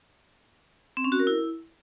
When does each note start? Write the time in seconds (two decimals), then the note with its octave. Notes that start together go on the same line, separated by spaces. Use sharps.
0.97 C4
1.04 C#4
1.12 F#4
1.19 A#4
1.27 E4